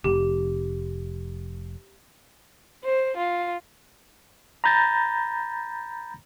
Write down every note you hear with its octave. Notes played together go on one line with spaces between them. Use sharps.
F1 G4
C5
F4
A#5 B5 G6 A6 A#6